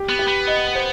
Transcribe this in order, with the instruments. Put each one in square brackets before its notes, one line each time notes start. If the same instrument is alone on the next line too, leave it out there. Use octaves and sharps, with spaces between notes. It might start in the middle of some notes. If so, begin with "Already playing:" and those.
Already playing: [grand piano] G4
[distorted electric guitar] B3
[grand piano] G4
[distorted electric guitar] B3
[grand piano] D#5
C5